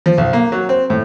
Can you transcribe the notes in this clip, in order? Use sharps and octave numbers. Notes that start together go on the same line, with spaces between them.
F3
B1
A#3
F#3
C4
A2